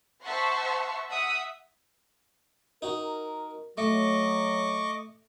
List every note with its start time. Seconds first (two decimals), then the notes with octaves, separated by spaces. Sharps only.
0.24 C5 E5 F#5 A5 C6 C#6
1.09 E5 F#5 D#6
2.82 D#4 F#4 A#4
3.78 F#3 A3 D#5 C#6 D6